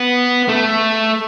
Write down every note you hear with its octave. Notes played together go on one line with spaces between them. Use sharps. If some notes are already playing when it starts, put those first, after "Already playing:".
Already playing: B3
A3